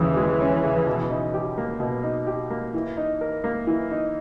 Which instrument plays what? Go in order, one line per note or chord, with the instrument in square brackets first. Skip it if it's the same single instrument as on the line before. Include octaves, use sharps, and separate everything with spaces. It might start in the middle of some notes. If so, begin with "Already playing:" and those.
Already playing: [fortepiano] D#2 C#3 [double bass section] E3
[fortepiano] G#3
C#4
C#3
B2
D#4
G4
A#3
B2
D#4
G4
A#3
E3
D#4
A#4
A#3
E3
D#4